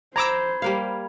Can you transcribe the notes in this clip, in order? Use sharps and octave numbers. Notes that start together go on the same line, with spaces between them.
C5 A#5 B5 D6 E6 G#6
G3 A#3 F5